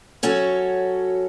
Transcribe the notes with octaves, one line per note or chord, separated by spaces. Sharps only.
F#3 C#4 F#4 A4 C#5